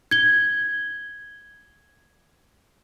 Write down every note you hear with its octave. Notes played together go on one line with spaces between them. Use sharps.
G#6 G7